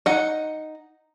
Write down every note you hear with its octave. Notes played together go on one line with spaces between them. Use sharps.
D#4 F#5